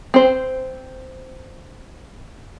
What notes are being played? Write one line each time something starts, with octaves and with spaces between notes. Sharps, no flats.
C4 C5